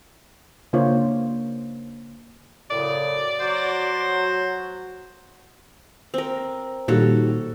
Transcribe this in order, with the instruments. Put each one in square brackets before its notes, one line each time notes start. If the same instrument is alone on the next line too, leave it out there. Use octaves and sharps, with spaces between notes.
[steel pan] C#3 A#3 D4 F4 C5 C#5
[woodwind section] F#2 A2 C#3 [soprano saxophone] D5
[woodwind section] F#3 F#4 [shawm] C5
[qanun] C4 A#4
[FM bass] A#2 [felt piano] D#3 G3 [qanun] F#4 A4 C#5